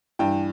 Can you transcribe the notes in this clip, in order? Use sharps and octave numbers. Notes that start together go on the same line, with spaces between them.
G2 E3 G5